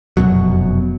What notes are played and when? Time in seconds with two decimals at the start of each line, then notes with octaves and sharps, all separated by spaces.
0.17 F1 F#2 B2 F#3